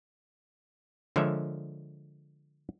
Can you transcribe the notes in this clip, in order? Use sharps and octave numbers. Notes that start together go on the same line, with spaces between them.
D3 F3 G#3 A#4 C#5 E5